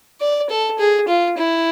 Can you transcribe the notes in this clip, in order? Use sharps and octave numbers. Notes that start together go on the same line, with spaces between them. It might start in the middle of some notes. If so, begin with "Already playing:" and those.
D5
A4
G#4
F4
E4